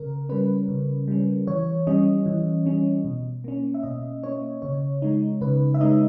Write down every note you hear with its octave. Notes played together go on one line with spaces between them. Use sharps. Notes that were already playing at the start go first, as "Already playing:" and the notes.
Already playing: C#3 A#4
G3 C#4 B4
C#3
G3 C#4
E3 C#5
G3 C#4 D#5
E3
G3 C#4
B2
A#3 C#4
E5
B2 D#5
A#3 C#4 C#5
C#3 C#5
G#3 D#4
C#3 B4
E5
G#3 D#4 D#5